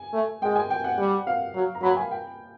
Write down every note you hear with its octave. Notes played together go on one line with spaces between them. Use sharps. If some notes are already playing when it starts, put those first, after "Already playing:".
Already playing: G#5
A3
G#3 G5
G#5
G5
F#5
G3
F5
F#3
A#5
F#3 B5
G#5
G5